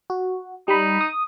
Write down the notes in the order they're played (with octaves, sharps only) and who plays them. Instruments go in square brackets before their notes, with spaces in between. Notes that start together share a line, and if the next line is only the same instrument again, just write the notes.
[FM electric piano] F#4
[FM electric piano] G3 B5 [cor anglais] D#4
[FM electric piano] D#6